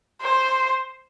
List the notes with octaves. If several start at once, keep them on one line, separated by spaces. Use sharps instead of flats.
C5